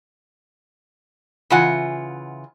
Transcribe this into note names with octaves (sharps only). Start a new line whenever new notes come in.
C#3 E3 F4 F#5 G#5